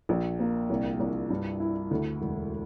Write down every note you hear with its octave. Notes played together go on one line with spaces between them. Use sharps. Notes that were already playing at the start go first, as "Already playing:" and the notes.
A#1
A#3
C2
C2
G2
E4
D2
E1